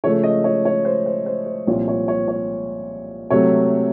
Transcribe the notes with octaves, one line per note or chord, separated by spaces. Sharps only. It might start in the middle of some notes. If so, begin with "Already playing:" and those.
C#3 F3 A3 C#5
D#5
C#5
C#5
C5
C5
C5
C5
C2 A#2 F3 C4 C#5
C#5
C#5
C#5
C3 F#3 A3 C#5